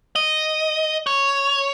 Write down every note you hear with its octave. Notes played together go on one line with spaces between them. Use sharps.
D#5
C#5